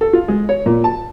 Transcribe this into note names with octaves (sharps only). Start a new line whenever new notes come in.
A4
F4
G#3
C#5
A#2
A5